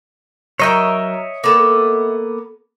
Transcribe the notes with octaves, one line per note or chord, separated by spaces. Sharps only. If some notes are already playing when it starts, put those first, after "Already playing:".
F#3 A#4 C#5 D#5 E5 G5
A#3 B3 A4